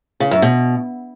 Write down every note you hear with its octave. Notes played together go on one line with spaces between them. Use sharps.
C#3
F#2
B2